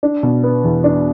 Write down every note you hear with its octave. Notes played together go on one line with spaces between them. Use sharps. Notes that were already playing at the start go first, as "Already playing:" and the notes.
D4
B2
B3
E2
D4